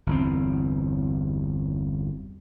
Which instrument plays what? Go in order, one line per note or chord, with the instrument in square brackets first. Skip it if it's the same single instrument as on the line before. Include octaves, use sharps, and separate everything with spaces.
[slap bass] G1 E2 C4